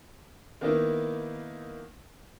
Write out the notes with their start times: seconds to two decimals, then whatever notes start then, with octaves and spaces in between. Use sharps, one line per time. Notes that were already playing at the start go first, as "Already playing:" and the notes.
0.61 D#3 A#3 B3 D#4 E4